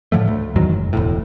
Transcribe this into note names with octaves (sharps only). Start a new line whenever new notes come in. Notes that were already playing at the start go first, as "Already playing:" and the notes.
A2 D3 F3 A3
D2
E2 G#2 D#3 F#3
F#1
E1 D2 A2